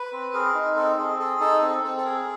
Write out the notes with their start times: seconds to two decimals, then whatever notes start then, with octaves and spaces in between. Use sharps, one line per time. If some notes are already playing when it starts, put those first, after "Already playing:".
Already playing: B4
0.13 C4
0.34 G#4 A#4
0.55 D#4
0.76 C4 A4
0.98 C4 G#4
1.19 G#4 A4
1.40 D#4 A4
1.62 C4 A4
1.83 C4 A4
1.98 A4
2.05 G#4 A#4